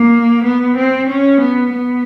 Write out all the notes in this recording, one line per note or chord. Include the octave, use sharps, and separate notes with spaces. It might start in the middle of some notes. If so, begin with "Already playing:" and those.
Already playing: A#3
B3
C4
C#4
B3
B3